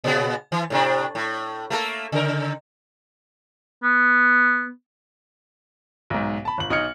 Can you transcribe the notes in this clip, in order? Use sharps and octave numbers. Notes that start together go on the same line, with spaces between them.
A#2 C#3 B3
E3
A2 C3 D4
A2
A3 A#3 A4
C#3 A#4
B3
B1 G#2
A5 B5
G1 F#7
B1 D#4 D#6 F6 G#6 C#7